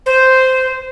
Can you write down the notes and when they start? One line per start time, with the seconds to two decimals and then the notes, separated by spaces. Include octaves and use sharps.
0.06 C5